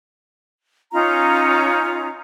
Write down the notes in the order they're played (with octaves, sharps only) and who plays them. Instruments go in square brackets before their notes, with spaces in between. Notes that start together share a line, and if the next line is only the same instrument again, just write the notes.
[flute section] C#4 D#4 F4 A#5